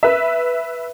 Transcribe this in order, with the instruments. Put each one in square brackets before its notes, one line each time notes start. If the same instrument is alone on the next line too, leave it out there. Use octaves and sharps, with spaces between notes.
[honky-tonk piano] B4 E5